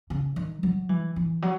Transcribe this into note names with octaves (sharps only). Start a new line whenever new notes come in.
C#3
D#3
F#3
E3
E3
F#3